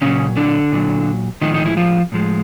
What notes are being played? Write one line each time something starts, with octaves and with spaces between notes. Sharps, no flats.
A#2 C#3 F#3 C#4
D3 D4
A#2 F#3
A2 D#3 F3 G#3 D#4
D#4
E4
F3 F4
A2 F3 G#3